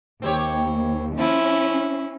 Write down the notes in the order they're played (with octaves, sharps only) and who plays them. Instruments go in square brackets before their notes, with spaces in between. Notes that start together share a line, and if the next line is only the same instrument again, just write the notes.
[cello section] D#2 [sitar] C4 G4 C#5
[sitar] F3 [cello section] C#4 [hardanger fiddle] E4